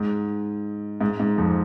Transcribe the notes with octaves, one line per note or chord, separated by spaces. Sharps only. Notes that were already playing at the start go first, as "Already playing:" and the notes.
Already playing: G#2
G#2
G#2
F2